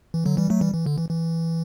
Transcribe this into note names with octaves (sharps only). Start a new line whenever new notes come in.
E3
D3 F#3
E3 G3
F#3 A3
E3 G3
E3
D3
E3
E3